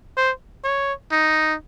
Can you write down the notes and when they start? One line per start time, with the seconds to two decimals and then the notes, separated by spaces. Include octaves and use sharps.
0.17 C5
0.64 C#5
1.12 D#4